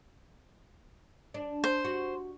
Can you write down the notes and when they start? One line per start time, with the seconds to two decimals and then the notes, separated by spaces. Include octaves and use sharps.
1.34 D4
1.64 C5
1.85 F#4